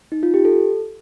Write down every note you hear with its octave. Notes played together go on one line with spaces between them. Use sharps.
D#4
F4
G4
A4